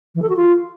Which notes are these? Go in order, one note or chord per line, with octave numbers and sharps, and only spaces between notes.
E3
A4
F#4
F4